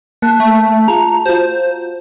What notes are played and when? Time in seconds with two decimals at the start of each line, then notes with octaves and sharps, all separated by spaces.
0.22 A#3 A5 F#6
0.40 A3
0.88 F4 G#4 A#5
1.25 F4 F#4 C5